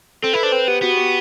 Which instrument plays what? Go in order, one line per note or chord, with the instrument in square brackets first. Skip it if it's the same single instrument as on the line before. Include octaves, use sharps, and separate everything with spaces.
[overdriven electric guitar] C4 [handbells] A4
[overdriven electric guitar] E4 [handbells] B4
[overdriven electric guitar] D4 [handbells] C5
[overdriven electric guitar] C4 [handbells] B4
[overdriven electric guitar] B3 [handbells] G4
[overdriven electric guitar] B3 [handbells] F#4
[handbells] G4